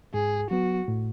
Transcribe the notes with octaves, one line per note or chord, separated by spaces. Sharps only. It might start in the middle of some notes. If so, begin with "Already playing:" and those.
G#2 G#4
F#3 B3 F#4
A2